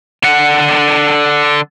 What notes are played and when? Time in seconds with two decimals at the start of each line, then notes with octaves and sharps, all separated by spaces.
0.24 D3 F#5